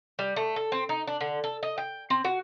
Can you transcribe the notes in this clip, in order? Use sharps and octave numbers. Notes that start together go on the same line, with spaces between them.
G3
A3
A4
C4
D#4
D4
D3
A4
D#5
G5
C4
F#4